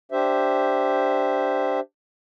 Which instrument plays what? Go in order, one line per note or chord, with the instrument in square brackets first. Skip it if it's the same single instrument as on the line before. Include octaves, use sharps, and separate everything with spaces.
[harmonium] D4 G4 C5 E5